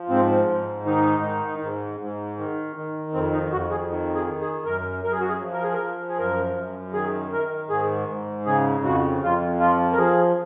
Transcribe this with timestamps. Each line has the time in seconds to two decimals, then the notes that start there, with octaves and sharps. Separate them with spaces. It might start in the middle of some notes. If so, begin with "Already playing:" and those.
Already playing: F3
0.09 G#2 C4
0.48 G#2
0.86 D#3 D#4
1.23 D#3
1.62 G#2
2.00 G#2
2.38 D#3
2.76 D#3
3.14 F2 C4
3.33 D#4
3.52 F2 F#4
3.70 G#4
3.89 D#3
4.15 G#4
4.28 D#3
4.41 G#4
4.65 F#2 A#4
5.04 F#2 A#4
5.12 G#4
5.20 F#4
5.28 G#4
5.42 F3
5.53 A#4
5.63 G#4
5.73 A#4
5.80 F3
6.09 G#4
6.18 F#2 A#4
6.56 F#2
6.93 D#3 G#4
7.32 D#3 A#4
7.70 G#2 G#4
8.09 G#2
8.46 C#3 G#4
8.84 F2 F#4
9.22 F2 F4
9.60 F3 F4
9.92 A#4
9.98 F3 G#4